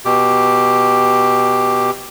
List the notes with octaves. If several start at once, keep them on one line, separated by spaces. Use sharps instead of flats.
B2 G4